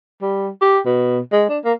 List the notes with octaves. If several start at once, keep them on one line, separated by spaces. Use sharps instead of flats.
G3
G4
B2
G#3
D4
A#3